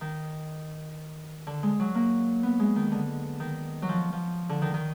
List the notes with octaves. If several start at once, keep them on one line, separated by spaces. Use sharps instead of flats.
D#3
D3
G#3
F#3
A#3
B3
G#3
D#3
D3
D#3
F#3
F3
F3
D3
D#3
D#3